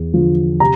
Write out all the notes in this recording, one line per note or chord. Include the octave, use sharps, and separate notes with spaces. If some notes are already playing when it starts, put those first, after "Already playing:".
Already playing: E2
D3 F3
C3 A#5